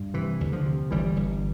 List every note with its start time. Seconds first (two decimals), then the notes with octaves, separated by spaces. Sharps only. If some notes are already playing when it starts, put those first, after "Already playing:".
Already playing: G2
0.14 C3 E3
0.41 D2
0.52 D3 F3
0.66 C3
0.91 G1 E3 G3
1.16 G1